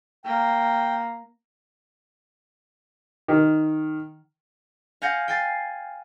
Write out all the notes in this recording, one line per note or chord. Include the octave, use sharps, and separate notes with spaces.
A#3 G5
D#3
F5 F#5 G#5 G6 A#6 C#7
G5 G#5 A6 C7